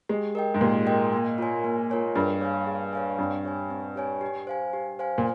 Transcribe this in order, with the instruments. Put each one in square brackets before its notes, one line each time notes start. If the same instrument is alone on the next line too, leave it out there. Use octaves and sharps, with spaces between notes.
[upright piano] G#3 [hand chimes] G4
[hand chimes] A#4 D#5 G5
[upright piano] G#2
[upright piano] A#2 [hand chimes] G4
[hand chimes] A#4 D#5 G5
A#3
F4 A#4 C#5 G#5
A#3
F4 A#4 C#5 G#5
[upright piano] G2 [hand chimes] G#4
[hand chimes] C#5 F5 G#5
G#4
C#5 F5 G#5
[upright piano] G2 [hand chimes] C4
[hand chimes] G4 C#5 G#5
C4
G4 C#5 G#5
G4
C5 F5 G#5
G4
C5 F5 G#5
[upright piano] A#2